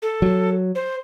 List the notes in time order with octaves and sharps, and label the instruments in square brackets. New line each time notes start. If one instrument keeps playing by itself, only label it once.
[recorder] A4
[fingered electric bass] F#3
[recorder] C5